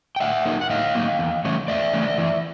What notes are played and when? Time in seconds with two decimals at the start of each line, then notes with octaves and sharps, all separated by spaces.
0.16 G5
0.20 A2 E5 F#5
0.45 F#3 A#3 D#4
0.61 F#5
0.70 A2 D#5 F5
0.95 F#3 A#3 D#4
1.19 E2
1.44 C#3 E3 A3 C#4
1.68 E2 D5 E5
1.94 C#3 E3 A3 C#4
2.18 E3